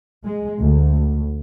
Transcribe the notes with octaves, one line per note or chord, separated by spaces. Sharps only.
G#3
D2